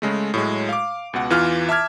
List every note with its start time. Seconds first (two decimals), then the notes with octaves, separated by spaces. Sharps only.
0.02 C#3 G#3 A3
0.34 A2 F#3 G#3
0.69 F5 D6
1.13 C#2 B2 F#5
1.30 E2 E3 F4 F6
1.69 E5 A5 D6 F6 G#6